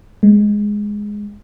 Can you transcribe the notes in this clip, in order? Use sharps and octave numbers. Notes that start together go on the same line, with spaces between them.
G#3